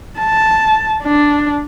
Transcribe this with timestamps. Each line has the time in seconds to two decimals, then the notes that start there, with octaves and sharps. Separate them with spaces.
0.19 A5
1.03 D4